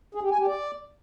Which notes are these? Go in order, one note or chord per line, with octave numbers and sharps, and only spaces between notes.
G#4
G4
G#5
G4
D5